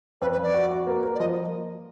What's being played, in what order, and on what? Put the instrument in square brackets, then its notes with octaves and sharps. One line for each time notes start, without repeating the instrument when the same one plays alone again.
[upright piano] F2 [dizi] B4
[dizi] B4
[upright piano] F2 [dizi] D5
[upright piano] F#4
F#4
A#3
A#3
[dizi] D5
[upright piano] F3 [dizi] D#5